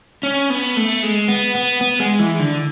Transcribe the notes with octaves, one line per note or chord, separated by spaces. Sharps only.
C#4
B3
A3
G#3
B3
B3
B3
G#3
E3
D3